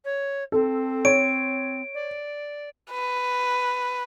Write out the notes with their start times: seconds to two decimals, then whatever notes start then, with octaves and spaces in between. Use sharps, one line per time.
0.04 C#5
0.52 C4 A4
1.05 C#5 D7
1.94 D5
2.91 B4